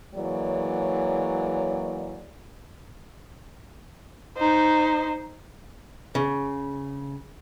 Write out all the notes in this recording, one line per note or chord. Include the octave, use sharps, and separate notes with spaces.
E3 F#3 G#3 A#3 C#5 D5
D#4 C5
C#3